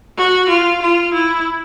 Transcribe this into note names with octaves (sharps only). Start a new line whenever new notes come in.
F#4
F4
F4
E4